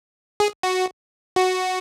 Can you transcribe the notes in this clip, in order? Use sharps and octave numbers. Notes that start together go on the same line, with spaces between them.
G#4
F#4
F#4